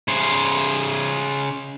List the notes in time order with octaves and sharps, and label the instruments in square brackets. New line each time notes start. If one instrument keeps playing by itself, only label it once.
[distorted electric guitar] C#3 C5